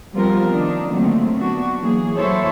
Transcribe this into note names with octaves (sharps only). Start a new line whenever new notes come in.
F3 G3 B3 C4 F4 A#4
D#3 D4 D#4
D3 D#3 F#3 A3 A#3 C4
B3 D4 F#4
E3 F#3 A#3 G#4
E3 F#3 E4 A4 C5 C#5